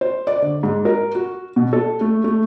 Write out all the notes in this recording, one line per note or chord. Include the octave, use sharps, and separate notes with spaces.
C5
D5
D3
G#2
A#4
F#4
B2
A4
A3
A3